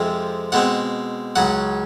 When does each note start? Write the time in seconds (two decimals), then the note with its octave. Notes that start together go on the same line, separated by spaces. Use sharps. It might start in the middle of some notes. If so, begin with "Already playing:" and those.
Already playing: F2 C3 F3 G#3 C4
0.52 B2 G#3 C4 F#5
1.36 C#2 C#3 F#3 F#5